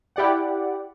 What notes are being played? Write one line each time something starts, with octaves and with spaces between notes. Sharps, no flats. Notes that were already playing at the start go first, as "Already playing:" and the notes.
E4 G4 D5 F#5